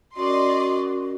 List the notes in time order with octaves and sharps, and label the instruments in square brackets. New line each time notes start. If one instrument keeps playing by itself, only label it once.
[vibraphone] C#4 A#4 [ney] F#4 [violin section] D5 D#5 C6